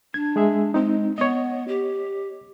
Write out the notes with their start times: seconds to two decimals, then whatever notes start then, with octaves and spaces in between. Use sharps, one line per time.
0.14 D4 G#6
0.36 G#3 G#4 E5
0.74 G#3 C4 D#4
1.18 B3 C#5 D#5
1.68 G4